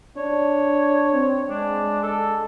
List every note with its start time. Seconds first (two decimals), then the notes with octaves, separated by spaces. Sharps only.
0.17 D4 C#5
1.13 C4
1.50 G#3 D4
2.03 A4